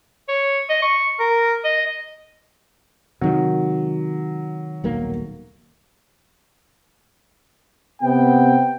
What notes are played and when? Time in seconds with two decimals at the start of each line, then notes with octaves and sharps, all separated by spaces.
0.28 C#5
0.69 D#5
0.82 C#6
1.20 A#4
1.64 D#5
3.21 C3 D#3 F#3 G#3
4.84 D#1 B1 A#3
8.02 C3 B3 G5